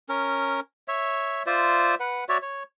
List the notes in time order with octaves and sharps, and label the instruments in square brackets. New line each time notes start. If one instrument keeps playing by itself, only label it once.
[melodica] C#4 A#4
C#5 E5
F4 C5 D5 E5
B4 F#5
F#4 C#5 D5 E5
C#5